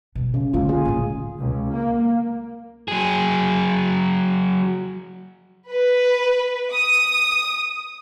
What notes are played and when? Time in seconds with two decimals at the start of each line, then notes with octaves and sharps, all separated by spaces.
0.15 B2 G3
0.34 C#3
0.53 D3 G#3 A#3 F4
0.69 G#4
0.85 D2 A#2
1.40 C#2
1.75 A#3
2.88 F#3 G#4
5.71 B4
6.74 D#6